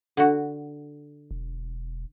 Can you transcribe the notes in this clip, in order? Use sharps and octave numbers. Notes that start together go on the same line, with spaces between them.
D3 F#4
E1